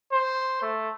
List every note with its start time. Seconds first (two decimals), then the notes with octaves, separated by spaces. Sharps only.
0.12 C5
0.62 A3